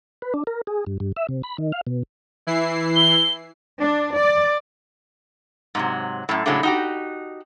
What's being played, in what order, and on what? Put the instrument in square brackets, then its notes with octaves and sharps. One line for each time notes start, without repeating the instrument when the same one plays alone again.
[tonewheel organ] B4
D4
A#4
G#4
G2
G2
E5
C3
B5
D#3
F5
B2
[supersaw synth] E3 E4 C7
[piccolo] G7
[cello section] D4
D5
[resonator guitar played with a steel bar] G#2 C3 F#3
F#2 A2
A2 C#3 F#3 G#3 A3 D4
D#4 F#4 G4